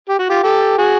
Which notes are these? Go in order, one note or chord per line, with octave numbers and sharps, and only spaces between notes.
G4
F#4
F4 G4
G4 A4
F#4 G#4